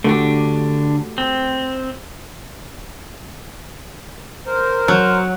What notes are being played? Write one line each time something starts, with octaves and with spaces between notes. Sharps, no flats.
D3 A3 D4 F#4 G4
C4
A#4 C5
F#3